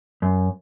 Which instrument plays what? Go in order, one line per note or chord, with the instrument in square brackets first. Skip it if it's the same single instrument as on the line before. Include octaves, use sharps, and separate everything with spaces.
[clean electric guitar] F#2